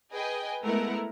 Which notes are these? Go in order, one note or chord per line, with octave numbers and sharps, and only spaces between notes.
G#4 B4 D#5 G5 G#5
G#3 A3 B3 E4 A#4 F#5